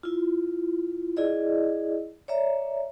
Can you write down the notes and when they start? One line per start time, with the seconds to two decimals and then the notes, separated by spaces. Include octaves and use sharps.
0.03 E4 F4
1.17 E4 G#4 D5 D#5
2.28 C#5 D5 E5 A#5